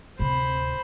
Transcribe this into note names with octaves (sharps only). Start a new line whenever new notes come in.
D1 C3 C5 B5